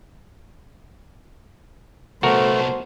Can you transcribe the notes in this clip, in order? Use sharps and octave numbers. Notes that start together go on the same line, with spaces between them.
C2 A3 B3 F#4 A#4 C5